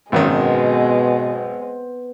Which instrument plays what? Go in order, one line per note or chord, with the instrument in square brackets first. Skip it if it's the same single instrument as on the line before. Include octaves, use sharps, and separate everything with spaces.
[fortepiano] G#1 F#2 D#3 [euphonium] B2 [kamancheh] G#3 [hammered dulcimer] B3 C4